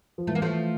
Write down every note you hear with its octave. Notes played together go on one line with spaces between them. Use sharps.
F3
E3 A3
A#3
F3 A3